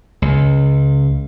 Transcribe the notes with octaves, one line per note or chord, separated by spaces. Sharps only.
C#2